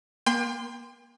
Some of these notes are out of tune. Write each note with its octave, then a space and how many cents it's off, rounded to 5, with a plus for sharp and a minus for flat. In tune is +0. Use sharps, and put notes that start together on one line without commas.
A#3 +40 G5 +35 C6 -10